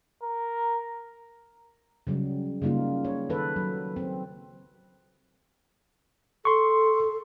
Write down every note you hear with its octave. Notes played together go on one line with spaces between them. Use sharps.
A#4
C#3 F#3 G3
C#3 G3 A#3 D#4 F4
C#5
D#3 A4 B4
F#3
C4
A4 C6 C#6